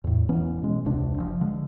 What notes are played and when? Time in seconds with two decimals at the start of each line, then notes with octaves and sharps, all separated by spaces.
0.04 E2 A2
0.29 E1 E3 B3 C#4
0.62 B2 G#3
0.85 E1 C#2 C3 D4
1.18 F#1 F3
1.41 D3 G#3